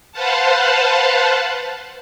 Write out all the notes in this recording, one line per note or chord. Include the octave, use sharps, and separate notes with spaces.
B4 C5 F5 F#5 A5